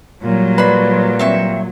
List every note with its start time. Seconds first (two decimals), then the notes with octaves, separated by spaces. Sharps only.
0.23 A#2 F#3 G3
0.58 B4 D5 B5 C6
1.19 C4 E5 C#6